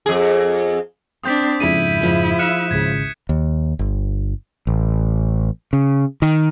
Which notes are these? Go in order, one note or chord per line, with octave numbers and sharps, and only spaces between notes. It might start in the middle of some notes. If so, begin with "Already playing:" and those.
F2 G#4
C4 D4 D#6 G6 B6
F2 G#2 C#3 E4 D#7
F3 G#3
F5 E6 F#6 C#7 E7
G#1 C#2 C#3 G#6 B6
D#2
G1
A1
C#3
D#3